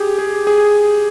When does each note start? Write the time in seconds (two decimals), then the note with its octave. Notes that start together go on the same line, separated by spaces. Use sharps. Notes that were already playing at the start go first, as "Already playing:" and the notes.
Already playing: G4 G#4
0.19 G#4
0.47 G#4